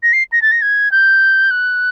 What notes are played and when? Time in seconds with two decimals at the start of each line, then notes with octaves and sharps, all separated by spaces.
0.03 A#6
0.13 C7
0.32 A#6
0.42 A6
0.52 A#6
0.62 G#6
0.92 G6
1.51 F#6